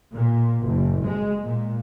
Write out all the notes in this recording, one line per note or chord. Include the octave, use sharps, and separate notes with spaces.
A#2
F#1
G#3
A#2